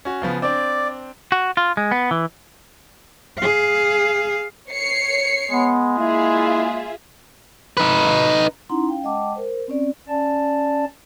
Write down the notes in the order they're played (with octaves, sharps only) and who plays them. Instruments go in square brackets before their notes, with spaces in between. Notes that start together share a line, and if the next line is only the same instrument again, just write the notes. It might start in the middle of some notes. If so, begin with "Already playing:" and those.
[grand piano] C#4 F#4
C#3 F3 B3
[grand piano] C4 D4 [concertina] D5
[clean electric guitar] F#4
F4
G#3
B3
E3
[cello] G#4 F5
[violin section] C#5 C7 C#7
[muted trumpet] G#3 [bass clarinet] B3
[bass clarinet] A#3 [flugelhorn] E4 [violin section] F4 G#4 E5
[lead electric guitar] D#4 B4
[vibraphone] C#4 D#4 E4 F#5 A#5 C6
C#4 F5 G5
G#3 D#5 F#5 G5 A5 D6
A#4 C5
C4 C#4 D5
[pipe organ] C#4 D5 A5